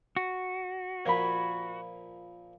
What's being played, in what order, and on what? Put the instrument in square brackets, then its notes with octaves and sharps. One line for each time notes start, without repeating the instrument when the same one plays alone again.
[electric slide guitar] F#4
[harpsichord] A#2 F3 A#4 [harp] B5 G#6